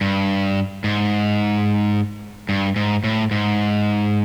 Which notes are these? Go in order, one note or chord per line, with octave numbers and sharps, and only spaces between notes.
G2
G#2
G2
G#2
A2
G#2